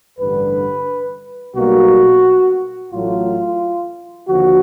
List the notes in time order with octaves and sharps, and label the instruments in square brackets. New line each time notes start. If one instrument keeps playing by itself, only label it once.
[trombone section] A1 G2 D3 G3 B4
B1 B2 G3 A#3 F#4
A1 A2 F#3 A3 F4
D#2 D3 F3 F#4